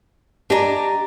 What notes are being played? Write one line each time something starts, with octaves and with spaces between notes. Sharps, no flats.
D4 G4 D#5 G#5 A#5